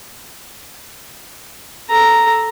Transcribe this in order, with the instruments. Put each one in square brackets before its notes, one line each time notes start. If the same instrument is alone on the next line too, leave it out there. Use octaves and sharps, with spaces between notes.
[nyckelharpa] A4 A#5